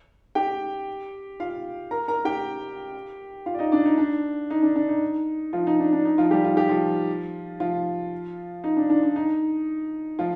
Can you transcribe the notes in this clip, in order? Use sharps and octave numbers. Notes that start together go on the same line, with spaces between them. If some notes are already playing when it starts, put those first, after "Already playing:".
G4 G5
F4 F5
A#4 A#5
A#4 A#5
G4 G5
F4 F5
D5
D#4 D#5
D4 D5
D#4
D4
D#4
D4
D4
D#4
F3 F4
D#4
D4
D4
D#4
F3 F4
G3 G4
F4
G4
F3 F4
F3 F4
D#4
D4
D4
D4
D#4
F3 F4